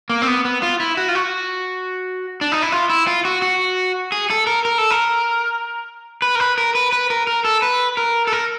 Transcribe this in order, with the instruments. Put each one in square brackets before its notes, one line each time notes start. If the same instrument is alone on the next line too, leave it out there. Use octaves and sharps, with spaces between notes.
[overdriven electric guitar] A#3
C4
B3
B3
F4
E4
F#4
F4
F#4
D4
D#4
E4
F4
E4
F4
F#4
F#4
G#4
A4
A#4
A#4
A4
A#4
B4
A#4
B4
A#4
B4
B4
A#4
A#4
A4
B4
A#4
A4
A#4